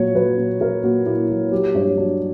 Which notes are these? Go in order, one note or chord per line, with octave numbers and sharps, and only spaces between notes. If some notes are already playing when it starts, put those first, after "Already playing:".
Already playing: A#2 F#3 C#5
F#3 B4
A#2
F#3 A#4
A#2 F#4
A#2 E4
F#3 F#4
F#3 G4
G2 C#5
F#3 D4